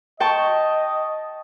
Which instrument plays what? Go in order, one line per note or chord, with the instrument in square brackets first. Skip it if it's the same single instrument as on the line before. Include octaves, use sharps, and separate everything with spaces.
[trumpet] D#5 [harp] G5 A5 C#6